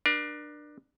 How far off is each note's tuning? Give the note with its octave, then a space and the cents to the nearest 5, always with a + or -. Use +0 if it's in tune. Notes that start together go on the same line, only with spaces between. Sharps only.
D4 +20 A#4 +40